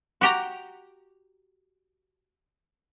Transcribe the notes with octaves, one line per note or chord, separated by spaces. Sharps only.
F#4 G4 A#5